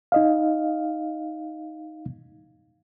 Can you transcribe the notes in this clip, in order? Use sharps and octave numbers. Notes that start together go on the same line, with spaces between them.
D#4 D#5 F5